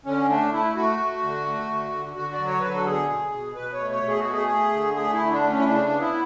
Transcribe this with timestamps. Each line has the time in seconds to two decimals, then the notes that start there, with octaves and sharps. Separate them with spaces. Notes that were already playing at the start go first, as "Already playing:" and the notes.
0.06 D3 C#4
0.29 A3 D4
0.52 A3 E4
0.75 A3 F#4
0.99 A3
1.23 D3
1.46 A3
1.69 D3
1.93 D3
2.16 D3 F#4
2.33 D5
2.39 F#3
2.47 C#5
2.60 D3 B4
2.73 A4
2.85 B2 G#4
3.09 B2
3.32 B2
3.56 B2 B4
3.73 C#5
3.79 A3
3.91 C#5
4.03 B2 G#4
4.20 F#4
4.26 A3
4.33 G#4
4.49 A3
4.72 D3
4.96 A3 G#4
5.13 E4
5.19 D3
5.31 D4
5.43 A3
5.48 C#4
5.59 E4
5.66 C#3 D4
5.89 B3
6.01 E4